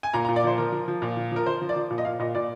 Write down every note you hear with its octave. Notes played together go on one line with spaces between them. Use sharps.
G#5
A#2 A#5
A#5
A#2
D5
F3 C5
F3 A#4
F3
F3
A#2
F3
F3 A#4
F3 C5
F3
D5
F3
A#2
D#5
A#2 F5
A#2 D#5
A#2 D5